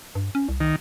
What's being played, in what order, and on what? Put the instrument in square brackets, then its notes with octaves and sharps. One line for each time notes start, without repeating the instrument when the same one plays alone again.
[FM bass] G2
C#4
C2
[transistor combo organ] D#3